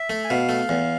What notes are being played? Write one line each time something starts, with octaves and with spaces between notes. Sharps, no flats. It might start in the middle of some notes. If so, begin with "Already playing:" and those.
Already playing: E5
A3
G#5
B2 F5
A3
E2